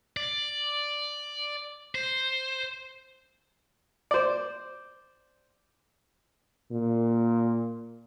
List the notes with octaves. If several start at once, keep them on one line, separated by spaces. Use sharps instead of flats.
D5
C5
C5 D5
A#2